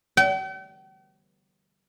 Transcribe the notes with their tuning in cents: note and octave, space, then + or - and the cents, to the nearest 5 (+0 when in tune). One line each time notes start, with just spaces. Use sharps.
G5 -45